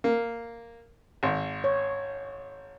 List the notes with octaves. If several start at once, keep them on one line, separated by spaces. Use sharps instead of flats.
A#3
G#1
C#5